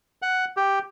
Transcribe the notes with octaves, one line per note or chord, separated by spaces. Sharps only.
F#5
G4